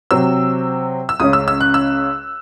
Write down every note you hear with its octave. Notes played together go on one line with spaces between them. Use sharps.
C3 F#3 C4 E6
E6
C#2 C#3 G#3 C#4 D#6
E6
E6
F#6
E6